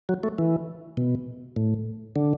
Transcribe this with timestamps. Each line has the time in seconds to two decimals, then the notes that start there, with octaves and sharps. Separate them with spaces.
0.09 F#3
0.23 A3
0.38 E3
0.97 B2
1.56 A2
2.16 D3